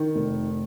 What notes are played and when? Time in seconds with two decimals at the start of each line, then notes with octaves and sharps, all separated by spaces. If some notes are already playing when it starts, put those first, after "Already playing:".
Already playing: D#3
0.15 F1